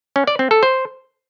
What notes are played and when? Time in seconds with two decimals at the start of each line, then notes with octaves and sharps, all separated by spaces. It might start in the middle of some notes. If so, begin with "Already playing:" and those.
0.16 C#4
0.27 D5
0.39 C4
0.51 A4
0.63 C5